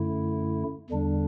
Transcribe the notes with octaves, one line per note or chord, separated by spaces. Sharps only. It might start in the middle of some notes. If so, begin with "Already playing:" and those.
Already playing: F#2 D3 A3 E4
E2 D3 G3 D4